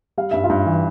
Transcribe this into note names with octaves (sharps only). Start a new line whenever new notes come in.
G3 F5
G2 E5
F4 F5
G2
E3